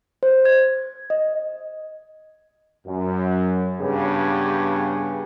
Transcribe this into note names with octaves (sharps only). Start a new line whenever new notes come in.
C5
G#6
D#5
F#2
G2 C#3 B3 G4 G#4